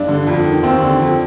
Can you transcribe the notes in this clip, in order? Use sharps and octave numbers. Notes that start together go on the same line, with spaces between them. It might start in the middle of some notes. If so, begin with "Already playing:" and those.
Already playing: G2 D4
D3
F2
D#3
D#2 C4
D3
F2